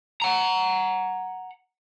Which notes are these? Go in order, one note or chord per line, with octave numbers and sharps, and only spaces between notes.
F#5 A#5